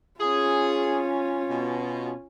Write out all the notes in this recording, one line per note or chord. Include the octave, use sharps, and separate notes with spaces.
C#4 F4 G#4
B2